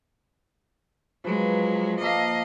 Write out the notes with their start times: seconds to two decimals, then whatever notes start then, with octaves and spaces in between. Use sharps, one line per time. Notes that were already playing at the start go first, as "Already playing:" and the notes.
1.24 F3 F#3 G#3 A#4 B4
2.00 A#3 A4 D#5 F5